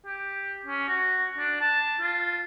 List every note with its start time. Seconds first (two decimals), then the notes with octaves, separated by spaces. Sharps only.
0.06 G4
0.66 C#4
0.89 F#4
1.38 D4
1.61 A5
2.02 F4